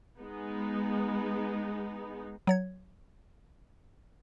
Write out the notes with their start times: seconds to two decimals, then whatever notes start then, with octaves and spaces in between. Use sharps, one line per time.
0.20 G#3 B3 D#4
2.47 F#3 C#5 G#6